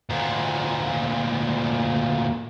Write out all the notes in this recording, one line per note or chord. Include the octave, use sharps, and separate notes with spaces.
D2 A#2